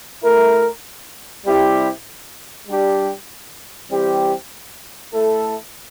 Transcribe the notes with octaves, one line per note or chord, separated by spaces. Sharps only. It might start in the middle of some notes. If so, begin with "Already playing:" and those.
A3 E4 A#4
C3 G3 C4 E4 G4
G3 D4 G4
E3 G3 C4 G4
A3 E4 A4